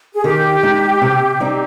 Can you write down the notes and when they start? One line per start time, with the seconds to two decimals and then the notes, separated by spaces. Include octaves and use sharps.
0.14 G#4
0.24 D#3 G4
0.63 G#3 D#4
1.02 C3
1.40 G3 C4 D#4